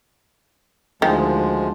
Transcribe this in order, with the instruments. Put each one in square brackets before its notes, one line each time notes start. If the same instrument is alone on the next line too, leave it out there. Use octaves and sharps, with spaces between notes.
[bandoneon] D2 F3 G#3 [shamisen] D#3